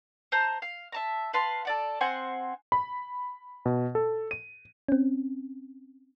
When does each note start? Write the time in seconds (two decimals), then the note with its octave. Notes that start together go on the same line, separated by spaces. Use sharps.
0.32 C5 A5 A#5
0.62 F5
0.92 E5 A5 A#5
1.33 B4 F5 A5 C6
1.65 A4 D5 F#5
2.00 C4 C5 F#5 G#5
2.72 B5
3.66 B2
3.95 A4
4.31 D#7
4.89 C4 C#4